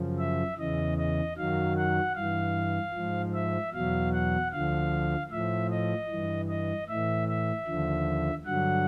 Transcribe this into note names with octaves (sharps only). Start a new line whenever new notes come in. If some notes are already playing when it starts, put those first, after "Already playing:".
Already playing: F#2 C#3 F3
E5
E2 C#3 E3 D#5
D#5
F#2 D#3 F#3 F5
F#5
G2 E3 F5
G#2 F3
E5
E2 B2 F#3 F5
F#5
D2 D3 F3 F5
A2 F3 E5
D#5
G2 E3
D#5
A2 E3 E5
E5
D#2 D3 F3
G2 D3 F#3 F#5